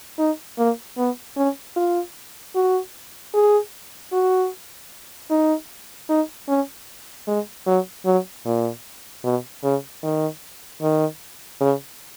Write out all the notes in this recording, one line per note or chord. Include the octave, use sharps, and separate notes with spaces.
D#4
A#3
B3
C#4
F4
F#4
G#4
F#4
D#4
D#4
C#4
G#3
F#3
F#3
A#2
B2
C#3
D#3
D#3
C#3